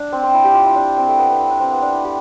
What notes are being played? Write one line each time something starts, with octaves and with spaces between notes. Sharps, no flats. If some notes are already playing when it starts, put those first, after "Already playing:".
Already playing: D4
C4
C4
E4
G4
F4
E4
D4
C4
A3
B3
B3
C4
D4
C4
B3
D4
E4
G4